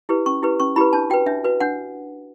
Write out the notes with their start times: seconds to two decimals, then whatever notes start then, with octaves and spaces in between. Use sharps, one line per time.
0.09 E4 G4 B4
0.26 C#4 C#6
0.43 E4 G4 B4
0.60 C#4 C#6
0.76 E4 G4 B4 B5
0.93 D4 A5
1.10 F#4 B4 G5
1.26 D4 E5
1.44 F#4 B4
1.60 D4 F#5